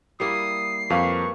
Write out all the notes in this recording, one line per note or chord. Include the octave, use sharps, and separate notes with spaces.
G3 A#3 E4 D#6 C7
F2 A#3 B4 F5 C#6